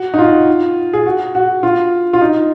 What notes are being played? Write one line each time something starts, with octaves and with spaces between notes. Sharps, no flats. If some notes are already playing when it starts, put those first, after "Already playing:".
Already playing: F#4
D#4
F4
G#4
F#4
F#4
F4
F4
D#4